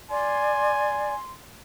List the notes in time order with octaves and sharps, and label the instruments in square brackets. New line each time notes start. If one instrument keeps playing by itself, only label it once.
[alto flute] D5 [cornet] G#5 [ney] C6